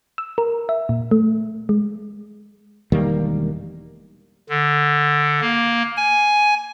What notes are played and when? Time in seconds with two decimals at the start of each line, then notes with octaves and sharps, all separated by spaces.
0.18 E6
0.38 A#4
0.69 E5
0.89 A#2
1.11 A3
1.69 G#3
2.92 E1 D#3 G3 A#3
4.50 D3
5.41 A#3
5.97 G#5